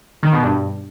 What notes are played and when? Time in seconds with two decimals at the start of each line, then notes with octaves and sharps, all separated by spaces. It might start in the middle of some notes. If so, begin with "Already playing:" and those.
0.23 D#3
0.33 B2
0.43 G2
0.53 G2